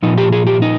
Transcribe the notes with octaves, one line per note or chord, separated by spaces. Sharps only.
A#2 F3 D#4
G4
G#4
G4
D#4